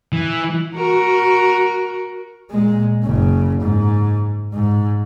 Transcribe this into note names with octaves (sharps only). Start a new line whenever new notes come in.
E3
F#4 A#4
A#2 G#3
F#1 C#3
G#2
G#2